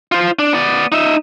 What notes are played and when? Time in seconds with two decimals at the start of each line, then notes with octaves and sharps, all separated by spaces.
0.12 F4 C5
0.39 D4
0.53 B3 D5
0.92 D#4 E5